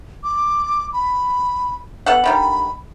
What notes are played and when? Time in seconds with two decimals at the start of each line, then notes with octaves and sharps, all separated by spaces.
0.24 D6
0.93 B5
2.06 B3 A4 F#5
2.24 D3 D#3 G3 B5